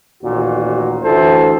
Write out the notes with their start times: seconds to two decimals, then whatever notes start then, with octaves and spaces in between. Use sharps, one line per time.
0.23 A1 D#2 A#2 F#4
1.03 D2 E3 A4 C5